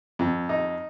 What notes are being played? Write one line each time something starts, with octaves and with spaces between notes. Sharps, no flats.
F2
D#4